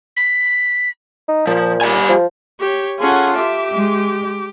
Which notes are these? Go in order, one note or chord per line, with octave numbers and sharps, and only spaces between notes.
B6
D#4
A#2 F3
G3 G#5
F3
G4 C#5
C#4 F4 G#4 A4 F#5
G4 E5 D6
G#3